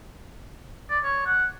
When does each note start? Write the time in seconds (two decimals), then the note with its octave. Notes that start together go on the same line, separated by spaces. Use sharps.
0.90 D5
1.04 C#5
1.26 F#5